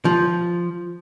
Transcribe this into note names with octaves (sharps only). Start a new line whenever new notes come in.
F3